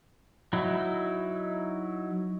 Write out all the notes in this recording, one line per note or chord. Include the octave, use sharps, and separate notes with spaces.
F#3 D#4 E4